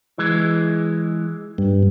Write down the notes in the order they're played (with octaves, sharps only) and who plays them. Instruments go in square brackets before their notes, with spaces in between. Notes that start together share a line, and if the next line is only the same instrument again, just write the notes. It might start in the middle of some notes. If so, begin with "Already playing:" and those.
[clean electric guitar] E3 G#3
[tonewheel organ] G2